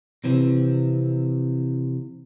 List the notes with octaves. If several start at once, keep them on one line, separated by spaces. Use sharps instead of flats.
C3 E3 F3 C4